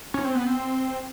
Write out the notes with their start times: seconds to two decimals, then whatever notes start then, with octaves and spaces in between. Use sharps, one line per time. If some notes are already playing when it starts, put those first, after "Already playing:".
0.14 C#4
0.25 C4
0.35 B3
0.46 C4